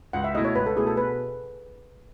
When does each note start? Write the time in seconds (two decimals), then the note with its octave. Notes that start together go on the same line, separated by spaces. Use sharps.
0.13 C#2 F#5
0.24 E5
0.34 B2 A3 E4 D#5
0.45 C#5
0.55 C#2 B4
0.66 A4
0.76 B2 A3 E4 G#4
0.87 A4
0.97 B2 B4